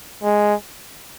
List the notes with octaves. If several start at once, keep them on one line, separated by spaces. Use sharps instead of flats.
G#3